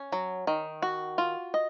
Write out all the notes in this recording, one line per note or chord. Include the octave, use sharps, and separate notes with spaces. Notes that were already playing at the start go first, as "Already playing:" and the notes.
Already playing: C#4
F#3
D#3
F#4
F4
D#5